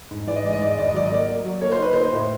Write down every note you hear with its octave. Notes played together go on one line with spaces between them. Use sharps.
G#2
E3 D5
D#5
G#3 D5
D#5
G#2 D5
D#5
G#1 D5
D#5
F#3 D5
D#5
A#3 D5
A#3
F#3
A#3 C#5
C5
D#4 B4
D#4 C5
A2